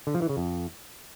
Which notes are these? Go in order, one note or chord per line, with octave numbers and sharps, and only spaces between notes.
D3
F3
E3
C#3
F2